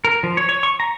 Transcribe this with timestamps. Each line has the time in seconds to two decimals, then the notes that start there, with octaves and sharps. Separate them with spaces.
0.05 A#4
0.23 F3
0.37 C#5
0.49 C#5
0.63 C#6
0.80 A#5